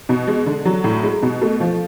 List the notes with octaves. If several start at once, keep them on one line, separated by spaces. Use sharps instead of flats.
B2
G#3
D3
F#3
A2
G#3
B2
A3
F3